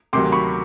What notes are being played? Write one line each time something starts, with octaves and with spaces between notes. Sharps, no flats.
D2 C3 D#3 F#3 C6 D6
B5 C#6